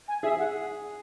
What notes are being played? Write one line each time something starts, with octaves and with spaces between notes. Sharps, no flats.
G#5
G#4 E5
F#5